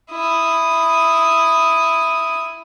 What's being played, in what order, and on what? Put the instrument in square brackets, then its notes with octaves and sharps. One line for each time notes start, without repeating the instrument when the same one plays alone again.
[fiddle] E4 D#6